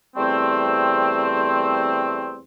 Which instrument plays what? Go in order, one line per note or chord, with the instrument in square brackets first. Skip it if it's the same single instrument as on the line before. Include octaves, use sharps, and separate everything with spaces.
[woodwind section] E2 G3 A3 C4